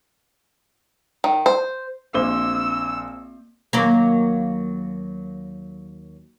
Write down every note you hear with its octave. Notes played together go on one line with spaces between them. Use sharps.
D#3
C5
A#1 A#3 C4 C5 E6 G7
D#2 F#3 A#3